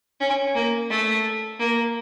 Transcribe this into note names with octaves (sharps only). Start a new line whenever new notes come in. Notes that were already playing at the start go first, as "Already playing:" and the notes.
C#4
A#3
A3
A#3